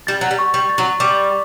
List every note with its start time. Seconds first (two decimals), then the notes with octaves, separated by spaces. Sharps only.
0.07 G3 A6
0.21 F#3
0.31 G3
0.39 C#6
0.54 G3
0.69 A6
0.78 F#3
1.00 G3 D6